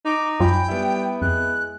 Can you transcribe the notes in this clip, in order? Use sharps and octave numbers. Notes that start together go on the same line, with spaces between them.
D#4 D6
F#2 F#3 F4 G5 G#5 B5
G3 B3 E4
F2 G#3 F#6